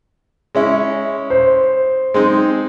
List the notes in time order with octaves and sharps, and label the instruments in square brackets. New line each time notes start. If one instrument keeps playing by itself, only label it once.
[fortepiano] G#3 C#4 E4
[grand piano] C5
[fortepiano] G#3 C4 D#4